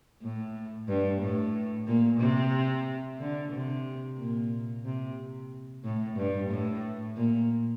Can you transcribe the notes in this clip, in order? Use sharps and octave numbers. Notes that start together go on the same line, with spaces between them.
A2
G2
A2
A#2
C3
D3
C3
A#2
C3
A2
G2
A2
A#2